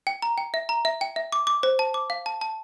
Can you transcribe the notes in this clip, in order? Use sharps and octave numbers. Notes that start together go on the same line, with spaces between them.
G5
A#5
G5
E5
A#5
E5
G5
E5
D6
D6
C5
A5
D6
F5
A5
A5